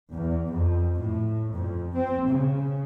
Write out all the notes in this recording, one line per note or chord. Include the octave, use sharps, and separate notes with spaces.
E2
F2
A2
F2
C4
C#3